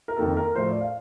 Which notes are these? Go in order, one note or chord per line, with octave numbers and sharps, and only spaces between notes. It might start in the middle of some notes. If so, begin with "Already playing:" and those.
A#4
F2 D#3 A#3 A4
A#4
A2 F3 A3 C5
D5
F5